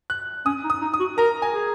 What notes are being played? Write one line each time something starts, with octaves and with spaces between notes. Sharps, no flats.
F#6
C#4 D#6
D#4
D#6
D#4
D#6
F#4
A#4 A#5
G#5
G#4